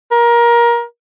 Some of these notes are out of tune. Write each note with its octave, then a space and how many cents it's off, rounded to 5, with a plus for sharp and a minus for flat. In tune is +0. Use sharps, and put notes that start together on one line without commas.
A#4 +20